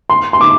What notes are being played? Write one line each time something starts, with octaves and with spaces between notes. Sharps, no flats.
C6
C6
D6